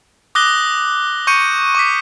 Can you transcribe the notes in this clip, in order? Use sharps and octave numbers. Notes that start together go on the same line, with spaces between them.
D6 D#6 F#6 A#6 G7
C#6 G6 C#7 D#7
C#6 D6 B6